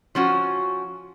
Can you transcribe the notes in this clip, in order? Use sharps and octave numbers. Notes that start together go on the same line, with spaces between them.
F3 C#4 F#4